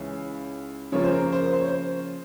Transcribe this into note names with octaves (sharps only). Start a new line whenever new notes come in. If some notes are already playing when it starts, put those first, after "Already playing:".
Already playing: C#2 C#3 E3 C#5
C#3 F3 A#3 F4 C#5
C5
A#4
C5
C5
C#5
C5